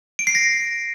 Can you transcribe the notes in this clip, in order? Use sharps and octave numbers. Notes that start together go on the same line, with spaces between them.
D7
C7
A#6